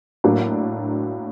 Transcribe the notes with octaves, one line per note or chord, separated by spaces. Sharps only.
A2 F#3 A#3 D4